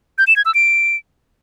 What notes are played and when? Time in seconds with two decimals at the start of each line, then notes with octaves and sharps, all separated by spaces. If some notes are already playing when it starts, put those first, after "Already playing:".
0.18 G6
0.27 E7
0.36 G#6
0.45 E6
0.54 D7